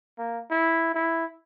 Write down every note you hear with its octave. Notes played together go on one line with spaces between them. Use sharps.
A#3
E4
E4